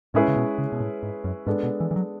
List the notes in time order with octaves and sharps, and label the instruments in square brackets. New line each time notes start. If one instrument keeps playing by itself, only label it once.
[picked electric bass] A2 [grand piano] G#3 C#4 E4 G#4 B4
[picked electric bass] C#3
B2
C#3
B2
A2
G#2
F#2
[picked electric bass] G#2 [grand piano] G#3 B3 D4 A4
[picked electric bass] B2
E3
E3
F#3